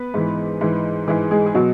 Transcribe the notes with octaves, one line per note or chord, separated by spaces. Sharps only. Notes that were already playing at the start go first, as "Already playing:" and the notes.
Already playing: B3 B4
G#2 E3
G#2 E3
G#2 E3 G#3 G#4
G#3 G#4
G#4
B2 F#3 F#4